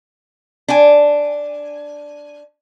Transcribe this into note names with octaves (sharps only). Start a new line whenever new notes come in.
D4 G#5